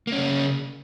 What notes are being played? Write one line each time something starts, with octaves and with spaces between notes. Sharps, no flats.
C#3 A#3 C#4